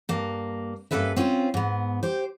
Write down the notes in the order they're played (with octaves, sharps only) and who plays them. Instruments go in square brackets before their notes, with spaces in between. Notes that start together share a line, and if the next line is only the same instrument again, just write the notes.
[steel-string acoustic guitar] G2 A#3
G2 A#3 C#4 A4 B4 E5
C4 C#4 F4 A#4 C5
G#2 B3
G4 C5